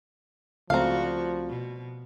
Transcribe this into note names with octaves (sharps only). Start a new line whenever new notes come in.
C#2 F3 G3 A3 C4 F#4 F5 A#5
B2